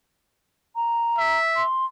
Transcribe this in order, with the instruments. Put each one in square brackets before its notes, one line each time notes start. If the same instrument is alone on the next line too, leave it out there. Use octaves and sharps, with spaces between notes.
[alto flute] A#5
[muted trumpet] E5
[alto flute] C6